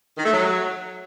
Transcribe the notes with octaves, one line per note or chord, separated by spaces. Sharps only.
D#3
A3
F#3